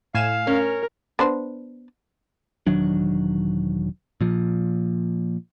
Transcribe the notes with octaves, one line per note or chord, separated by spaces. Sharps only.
A2 F5 G#5 E7
C#4 A#4
B3 D4 C5
E1 D#3 F#3 D4
A#2 F3